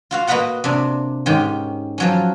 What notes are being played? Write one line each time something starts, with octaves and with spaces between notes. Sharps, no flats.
F4 F#4 F5
A#3 F#4 B4 D#5 F#5 A#5
C3 D4
G#2 D#3 C#4 G4
F3 F#3 C#4